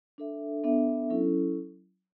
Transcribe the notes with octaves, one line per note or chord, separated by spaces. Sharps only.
D4 A4 E5
B3 D4 A4 E5
F#3 C#4 E4 A4